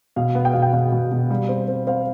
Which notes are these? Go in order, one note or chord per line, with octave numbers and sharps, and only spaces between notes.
B2 F5
B3
G5
B2 F5
G5
B2 F5
B2
B2
G3
C4
C4
C4 F5